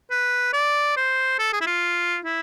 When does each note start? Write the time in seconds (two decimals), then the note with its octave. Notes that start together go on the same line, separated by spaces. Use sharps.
0.11 B4
0.53 D5
0.97 C5
1.39 A4
1.53 G#4
1.61 E4
1.67 F4
2.25 E4